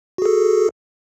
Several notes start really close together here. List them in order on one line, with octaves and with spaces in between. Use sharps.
F#4 G#4 A4